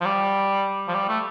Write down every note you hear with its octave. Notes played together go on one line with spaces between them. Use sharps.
F3
G3
F3
G3
A3